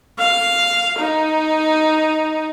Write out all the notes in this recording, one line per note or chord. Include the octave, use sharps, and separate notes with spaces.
F5
D#4